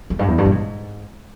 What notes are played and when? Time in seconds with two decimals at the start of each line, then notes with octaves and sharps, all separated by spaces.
0.10 E2
0.19 G2
0.28 E2
0.38 G2
0.45 A#2
0.52 G#2